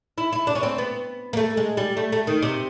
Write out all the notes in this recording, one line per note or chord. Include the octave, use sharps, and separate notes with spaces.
E4
E4
D4
C#4
C4
B3
A#3
A3
G#3
G3
A3
A3
D#3
C3